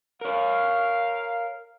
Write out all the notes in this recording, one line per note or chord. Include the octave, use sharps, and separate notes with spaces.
A#4 C#5 F5